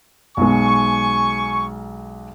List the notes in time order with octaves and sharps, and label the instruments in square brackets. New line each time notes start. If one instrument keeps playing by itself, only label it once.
[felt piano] B1 G#3 [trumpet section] G#5 C#6